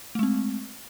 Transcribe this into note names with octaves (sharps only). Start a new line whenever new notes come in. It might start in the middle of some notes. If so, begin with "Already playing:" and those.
G#3 A3 C4